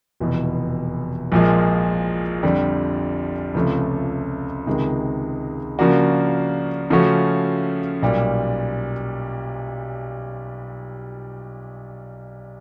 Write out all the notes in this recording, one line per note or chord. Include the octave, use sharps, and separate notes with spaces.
F1 E2 B2
A#1 A#2 F3 G#3
F2 D3 G3
C#2 C3 F3 A3 C#4
C#2 C3 D#3 G#3
C#3 F3 A#3 D4 F#4
C#3 F3 A3 C#4 F#4
B1 A#2 G3